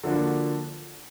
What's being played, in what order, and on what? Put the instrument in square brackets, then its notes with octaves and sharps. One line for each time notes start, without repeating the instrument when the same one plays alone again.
[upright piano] D3 F3 A#3 D4 F#4